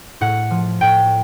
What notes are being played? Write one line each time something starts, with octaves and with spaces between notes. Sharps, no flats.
A2 F#5
F3
A2 G5